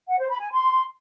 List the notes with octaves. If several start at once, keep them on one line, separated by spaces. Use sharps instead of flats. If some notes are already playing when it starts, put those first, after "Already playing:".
F#5
C5
B5
G#5
C6